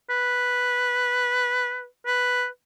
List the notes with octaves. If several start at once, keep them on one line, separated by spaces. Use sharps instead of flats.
B4
B4